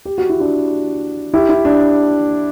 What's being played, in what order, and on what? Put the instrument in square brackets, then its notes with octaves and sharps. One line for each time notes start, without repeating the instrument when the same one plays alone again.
[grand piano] G4
F#4
E4
D4 F#4
E4 G4
E4
D4